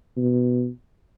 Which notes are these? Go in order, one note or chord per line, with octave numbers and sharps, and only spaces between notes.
B2